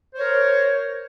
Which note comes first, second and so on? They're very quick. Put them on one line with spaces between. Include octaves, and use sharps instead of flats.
C5 C#5 A#4